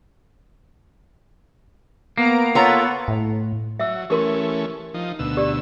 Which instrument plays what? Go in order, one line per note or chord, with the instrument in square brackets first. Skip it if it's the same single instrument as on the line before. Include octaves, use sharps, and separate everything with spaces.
[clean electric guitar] A#3 [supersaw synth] B3 A#5 D7
[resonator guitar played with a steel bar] B3 A#5 [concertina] F4 A4 [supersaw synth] C#5 F#5
[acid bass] A2
[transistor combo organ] F#3 [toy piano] E5 E6
[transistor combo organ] E3 A3 C#4 [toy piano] G4 A#4 C6
[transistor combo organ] F3 D#4
D2 B2 E6
[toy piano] G4 D5